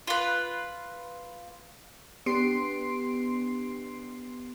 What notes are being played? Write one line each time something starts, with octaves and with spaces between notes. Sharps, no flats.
F4 B4
B3 D4 G4 C6 C7 D7